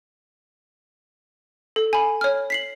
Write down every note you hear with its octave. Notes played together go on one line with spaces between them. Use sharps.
A4
G#5 B5
C#5 F6
B6 C7 F#7